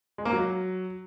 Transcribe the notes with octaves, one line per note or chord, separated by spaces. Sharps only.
G#3
A#3
F#3